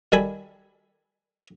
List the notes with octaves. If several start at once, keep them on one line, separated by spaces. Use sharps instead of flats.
D#3 G3 A4 G#5 B5